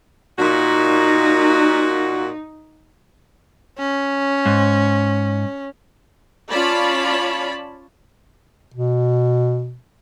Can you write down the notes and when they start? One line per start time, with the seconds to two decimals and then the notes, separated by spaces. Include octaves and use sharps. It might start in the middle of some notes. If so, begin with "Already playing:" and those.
0.39 A#2 D#4 F#4
3.78 C#4
4.46 G#2
6.50 C#4 F4 C#5 D5 A5 B5
8.74 B2